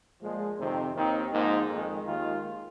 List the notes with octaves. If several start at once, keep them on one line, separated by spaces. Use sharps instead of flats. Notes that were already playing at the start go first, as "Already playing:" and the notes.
A#2 F3 G#3
F2 C3 D#3 C4
D#2 D#3 C4 D#4
G#2 F3 A#3 D#4
F2 D#3 G#3
D#2 D#3 G#3 F4